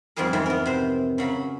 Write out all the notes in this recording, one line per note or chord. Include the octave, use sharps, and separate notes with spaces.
F2 G#2 F3 G3 G#4 A#4
F2 G#2 D#3 E3
B3 A#4
C3 C5
C#3 F#3 B5